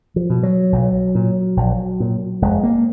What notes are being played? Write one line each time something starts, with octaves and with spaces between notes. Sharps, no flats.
F3
B2
F#3
B1
A#2
A#1
A#2
F1 G#3
A#3